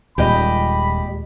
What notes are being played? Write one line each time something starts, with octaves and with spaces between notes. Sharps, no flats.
D#1 D#2 A#2 G#3 G4 D#5 B5